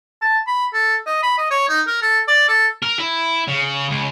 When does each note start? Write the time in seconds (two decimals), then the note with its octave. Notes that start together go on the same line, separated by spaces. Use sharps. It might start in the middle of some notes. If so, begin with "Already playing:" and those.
0.22 A5
0.47 B5
0.73 A4
1.07 D#5
1.23 B5
1.38 D#5
1.51 C#5
1.68 D#4
1.87 A#4
2.02 A4
2.28 D5
2.48 A4
2.83 A#4
2.99 E4
3.48 C#3
3.90 C#2